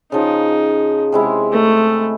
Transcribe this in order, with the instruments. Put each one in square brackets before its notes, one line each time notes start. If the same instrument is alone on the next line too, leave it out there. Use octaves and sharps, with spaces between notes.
[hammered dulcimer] C#3 F3 [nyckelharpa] D#4
[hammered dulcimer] C3 G#3 E4
[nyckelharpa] A3